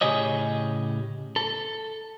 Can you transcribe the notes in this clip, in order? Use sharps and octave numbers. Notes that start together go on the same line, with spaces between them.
A2 C#3 G4 G#4 C#5 D#5
A4